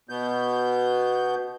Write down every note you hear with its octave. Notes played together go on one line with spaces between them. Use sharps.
B2 B3 G6